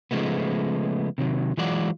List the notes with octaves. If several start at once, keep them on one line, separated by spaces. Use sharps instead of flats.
C#3 F3 G#3 A3 B3
C3 D#3 F#3
E3 F#3 G#3 F4 D5 F#5